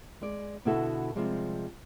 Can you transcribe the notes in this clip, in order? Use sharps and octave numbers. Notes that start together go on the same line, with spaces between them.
G#3 D5
B2 D3 B3 E4 F#4 A4
C3 F3 G3 G#3